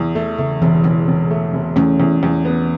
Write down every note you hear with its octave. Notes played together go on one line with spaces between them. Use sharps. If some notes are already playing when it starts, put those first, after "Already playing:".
Already playing: E2
E3 A3
C#3 A3
E1 E3
E1 E3
E1
A3
E1
E2 A3 C#4
E2
E2
B3